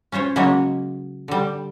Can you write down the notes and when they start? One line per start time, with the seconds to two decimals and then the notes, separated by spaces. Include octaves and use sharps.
0.12 C#4 F4 C5 C#5
0.36 C#3 F#3 G#3 A#3 C#5 D#5
1.28 D3 G3